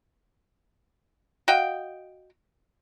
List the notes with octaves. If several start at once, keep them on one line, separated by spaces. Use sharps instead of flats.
F#4 D#5 F5 G5